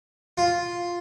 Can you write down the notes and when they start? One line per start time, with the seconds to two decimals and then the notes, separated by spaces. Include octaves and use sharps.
0.38 F4